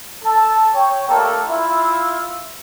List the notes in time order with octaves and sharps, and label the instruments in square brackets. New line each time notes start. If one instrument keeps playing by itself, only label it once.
[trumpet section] A4 A5
C#5 G5
A3 A#3 D4 G4 A4 A#4
E4 F4 E5